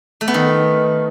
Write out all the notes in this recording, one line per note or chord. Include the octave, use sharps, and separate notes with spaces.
A3
B3
D#3